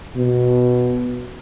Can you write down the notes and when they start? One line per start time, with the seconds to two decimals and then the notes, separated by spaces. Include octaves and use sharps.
0.16 B2